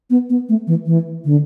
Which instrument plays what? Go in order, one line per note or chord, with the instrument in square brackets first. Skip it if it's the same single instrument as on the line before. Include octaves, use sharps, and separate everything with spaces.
[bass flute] B3
B3
A3
E3
E3
D3